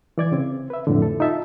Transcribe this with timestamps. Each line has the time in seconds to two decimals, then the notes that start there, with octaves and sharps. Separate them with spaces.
0.18 E3 D5 G#6
0.32 C#3 C4
0.70 B4 E5
0.87 F2 A2 D3
1.02 A4
1.20 D#4 F4 E5 A5